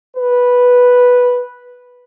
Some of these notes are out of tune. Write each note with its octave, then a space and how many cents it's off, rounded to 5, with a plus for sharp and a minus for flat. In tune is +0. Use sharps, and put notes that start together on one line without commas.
B4 -5